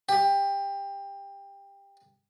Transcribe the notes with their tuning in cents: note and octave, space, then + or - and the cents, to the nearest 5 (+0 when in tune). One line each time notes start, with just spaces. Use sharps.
G4 +20